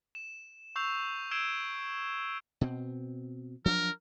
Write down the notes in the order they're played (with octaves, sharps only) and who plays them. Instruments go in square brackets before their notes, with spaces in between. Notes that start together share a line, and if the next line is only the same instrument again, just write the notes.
[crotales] E7
C#6 E6 G6 C7 F7
E6 G#6 C7 D7 E7 G7
[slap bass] B2 C4
[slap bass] F3 F#3 D4 [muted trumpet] A#4